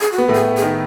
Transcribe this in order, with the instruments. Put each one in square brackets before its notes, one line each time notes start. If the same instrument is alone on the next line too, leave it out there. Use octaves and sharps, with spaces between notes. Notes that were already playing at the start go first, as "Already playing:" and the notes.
[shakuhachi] G#4
F#4
[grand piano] B3
A2 A3
[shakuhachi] G#4
G#4
[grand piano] D#3